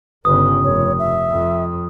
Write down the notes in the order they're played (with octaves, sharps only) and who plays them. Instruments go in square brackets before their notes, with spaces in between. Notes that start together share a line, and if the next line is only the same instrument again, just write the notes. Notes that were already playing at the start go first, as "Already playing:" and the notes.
[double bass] G1 C#3 [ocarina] B4 [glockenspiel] D#6
[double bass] F1 [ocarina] C#5
[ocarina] E5
[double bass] F2